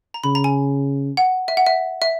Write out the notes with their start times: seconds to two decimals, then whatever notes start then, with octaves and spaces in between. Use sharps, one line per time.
0.14 A#5
0.24 C#3 B5
0.35 A#5
0.44 G#5
1.17 F#5
1.48 E5
1.57 F#5
1.66 E5
2.02 E5